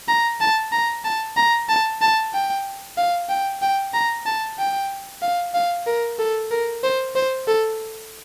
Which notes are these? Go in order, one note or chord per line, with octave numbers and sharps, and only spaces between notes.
A#5
A5
A#5
A5
A#5
A5
A5
G5
F5
G5
G5
A#5
A5
G5
F5
F5
A#4
A4
A#4
C5
C5
A4